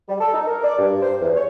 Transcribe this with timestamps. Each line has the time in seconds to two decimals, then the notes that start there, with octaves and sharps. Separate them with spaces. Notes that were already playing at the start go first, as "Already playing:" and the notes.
0.09 G3
0.20 A4
0.34 D#4
0.48 A#4
0.63 D5
0.78 G2
1.02 C5
1.21 E2
1.36 C#5